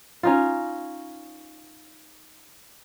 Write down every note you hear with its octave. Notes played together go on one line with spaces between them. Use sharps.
C#4 D#4 F4